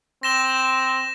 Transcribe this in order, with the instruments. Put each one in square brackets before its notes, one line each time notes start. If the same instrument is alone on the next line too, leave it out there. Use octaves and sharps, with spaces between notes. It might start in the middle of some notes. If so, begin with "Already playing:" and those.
[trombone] C4 [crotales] A#6 E7 G7